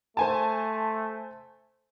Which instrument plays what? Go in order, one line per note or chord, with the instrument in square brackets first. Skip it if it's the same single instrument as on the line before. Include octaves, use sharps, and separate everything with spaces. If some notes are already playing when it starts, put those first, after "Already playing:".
[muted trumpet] A3 [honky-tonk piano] C5 G#5 A5